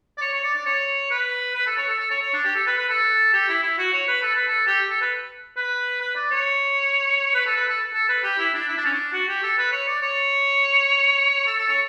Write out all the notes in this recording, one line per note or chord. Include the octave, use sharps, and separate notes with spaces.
D5
C#5
C#5
D5
D5
C#5
B4
B4
A4
C#5
A4
A4
C#5
C#5
D4
G4
A4
B4
B4
A4
G4
E4
E4
F#4
C#5
B4
A4
B4
A4
G4
A4
B4
B4
B4
D5
C#5
B4
A4
B4
A4
A4
B4
G4
E4
D4
E4
D4
C#4
D4
F#4
G4
A4
B4
C#5
D5
C#5
A4
A4
C#5